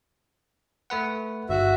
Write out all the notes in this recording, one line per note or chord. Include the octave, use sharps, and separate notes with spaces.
A3 B4 F#5
G1 F#4 E5